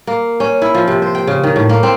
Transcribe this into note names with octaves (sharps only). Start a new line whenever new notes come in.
A#3
C#4
E4
F3
C3
C5
G5
C#3
D#3
A2
A#3
C4